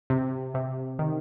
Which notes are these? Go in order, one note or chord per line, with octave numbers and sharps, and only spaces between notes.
C3
C3
D#3